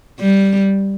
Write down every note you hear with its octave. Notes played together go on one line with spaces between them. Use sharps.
G3